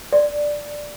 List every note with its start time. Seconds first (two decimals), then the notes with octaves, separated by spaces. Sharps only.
0.13 D5